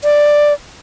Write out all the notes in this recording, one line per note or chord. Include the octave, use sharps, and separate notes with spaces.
D5